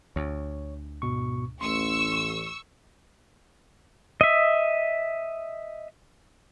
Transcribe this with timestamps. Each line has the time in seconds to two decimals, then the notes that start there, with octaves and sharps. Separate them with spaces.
0.16 D2 C#5
1.02 G#2 B2 C#6
1.61 A1 C6 C#6 E6
4.21 D#5 E5